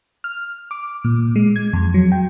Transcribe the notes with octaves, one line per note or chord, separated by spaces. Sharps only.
F6
D6
A#2
G#3
G#6
F2
F#3
G5